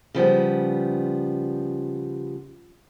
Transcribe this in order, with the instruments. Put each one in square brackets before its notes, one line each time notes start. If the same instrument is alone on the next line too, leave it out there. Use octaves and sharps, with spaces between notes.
[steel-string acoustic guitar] C#3 F3 G3 B3